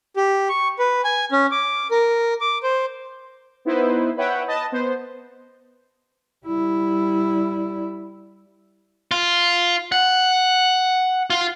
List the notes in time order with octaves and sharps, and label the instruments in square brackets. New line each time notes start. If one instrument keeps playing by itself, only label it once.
[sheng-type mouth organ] G4
C#6
B4
G#5
C#4
D6
A#4
D6
C5
[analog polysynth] B3 D#4 E4 B4 C5
B4 C#5 E5 F#5 G5
B4 D#5 A5
B3 C5
[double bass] G3 E4
[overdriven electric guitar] F4
F#5
F4